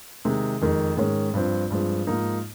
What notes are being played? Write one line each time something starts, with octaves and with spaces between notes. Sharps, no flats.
C3 D#3 G#3 D#4
F2 D#3 G#3
G#2 D#3 G#3 C#4
G2 F3 C4
G2 F3 G#3 C4
G#2 F3 A#3 D#4